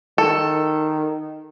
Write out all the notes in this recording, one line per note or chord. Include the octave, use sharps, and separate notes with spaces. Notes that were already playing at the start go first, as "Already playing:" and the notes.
D#3 A4